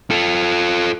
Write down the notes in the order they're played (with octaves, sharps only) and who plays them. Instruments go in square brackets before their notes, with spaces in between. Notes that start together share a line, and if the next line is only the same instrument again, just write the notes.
[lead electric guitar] F4 A4